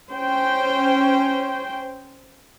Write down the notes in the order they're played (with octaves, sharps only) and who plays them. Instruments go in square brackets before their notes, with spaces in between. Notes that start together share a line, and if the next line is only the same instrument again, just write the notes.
[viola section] C#4 C5 G5